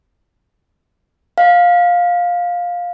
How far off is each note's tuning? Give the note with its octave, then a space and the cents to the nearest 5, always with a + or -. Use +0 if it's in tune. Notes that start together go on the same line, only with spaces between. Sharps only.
F5 +15